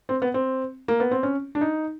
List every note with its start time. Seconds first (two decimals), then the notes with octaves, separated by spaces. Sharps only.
0.09 C4
0.22 B3
0.34 C4
0.88 A#3
1.00 B3
1.11 C4
1.23 C#4
1.55 D4
1.61 D#4